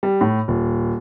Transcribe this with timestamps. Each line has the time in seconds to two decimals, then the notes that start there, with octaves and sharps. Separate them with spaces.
0.03 G3
0.21 A2
0.48 D#1